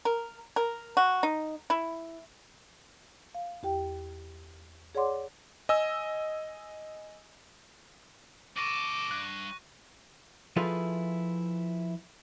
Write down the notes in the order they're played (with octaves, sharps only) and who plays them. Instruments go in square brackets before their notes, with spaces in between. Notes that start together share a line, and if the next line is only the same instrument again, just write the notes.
[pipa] A#4
A#4
F#4
D#4
E4
[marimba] F5
E2 G4 G5
G#4 C#5 D5 F#5 C6 D6
[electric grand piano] D#5 G#5 E6
[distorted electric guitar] C#2 A4 [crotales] C#6 A#6 D#7 [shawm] D6
[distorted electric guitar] G2 [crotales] F#6
[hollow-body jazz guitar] F3 E4 F4 G#4 A4 B4